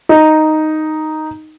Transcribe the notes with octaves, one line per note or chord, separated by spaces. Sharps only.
D#4